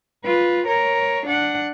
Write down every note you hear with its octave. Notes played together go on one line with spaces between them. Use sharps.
F4 B4
A#4 C#5
D4 F#5